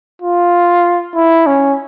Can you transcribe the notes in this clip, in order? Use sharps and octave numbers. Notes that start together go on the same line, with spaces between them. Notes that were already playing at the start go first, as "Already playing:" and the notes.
F4
E4
C#4